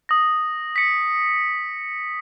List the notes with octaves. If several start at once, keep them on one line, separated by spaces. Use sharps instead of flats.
D#6 A#6
B6 C#7